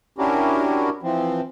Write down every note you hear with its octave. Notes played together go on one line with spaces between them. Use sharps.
C#4 D4 E4 F#4 G4 A#4
E3 F3 C4